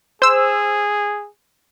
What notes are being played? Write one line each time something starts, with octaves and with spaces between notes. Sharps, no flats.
G#4 C5 E6